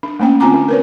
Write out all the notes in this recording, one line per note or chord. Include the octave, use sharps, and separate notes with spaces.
D4
A3 A#3 C#4 G5
D3 C4 F4 G#5 A#5 D6
D4
A#4 B4 C#5